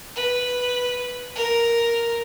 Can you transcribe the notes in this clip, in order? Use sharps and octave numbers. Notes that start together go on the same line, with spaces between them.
B4
A#4